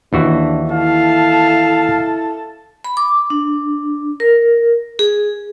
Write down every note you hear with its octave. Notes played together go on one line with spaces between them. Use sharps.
D#2 E3 D4 F#4
E4 A4 F5 A5
B5
D6
D4
A#4
G#4